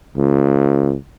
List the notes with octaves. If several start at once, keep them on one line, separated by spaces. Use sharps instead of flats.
C#2